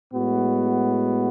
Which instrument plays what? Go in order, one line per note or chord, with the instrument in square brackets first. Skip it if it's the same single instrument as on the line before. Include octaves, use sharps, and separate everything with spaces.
[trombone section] A2 G#3 B3 F#4